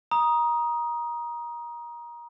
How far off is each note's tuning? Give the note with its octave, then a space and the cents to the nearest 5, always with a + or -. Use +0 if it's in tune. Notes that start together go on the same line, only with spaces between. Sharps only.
A#5 +25 D#6 +0